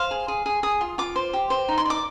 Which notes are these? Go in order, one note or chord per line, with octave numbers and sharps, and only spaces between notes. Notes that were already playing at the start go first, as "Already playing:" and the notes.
Already playing: C5 F5
G#4
G#4
G#4
G#4 D#6
F4
F4 D6
C5
G4
C5
D#4
C6
D5 D6